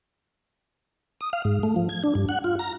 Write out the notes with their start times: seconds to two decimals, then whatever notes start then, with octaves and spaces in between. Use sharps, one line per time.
1.21 D#6
1.33 F5
1.45 G#2
1.63 A3
1.76 F3
1.89 G#6
2.04 D4
2.15 G2
2.29 F#5
2.44 F4
2.59 A#5